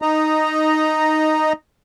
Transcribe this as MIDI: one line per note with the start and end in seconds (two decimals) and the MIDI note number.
0.02 1.53 63
0.02 1.53 75
0.02 1.53 82